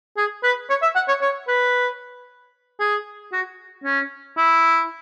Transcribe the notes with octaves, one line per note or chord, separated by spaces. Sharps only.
G#4
B4
C#5
E5
F#5
C#5
C#5
B4
G#4
F#4
C#4
E4